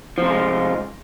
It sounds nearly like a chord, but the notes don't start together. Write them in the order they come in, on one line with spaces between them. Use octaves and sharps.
F3 C3 F4 G#3